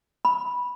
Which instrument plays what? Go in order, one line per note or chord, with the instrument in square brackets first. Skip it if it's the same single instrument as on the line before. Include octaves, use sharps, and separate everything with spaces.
[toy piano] B5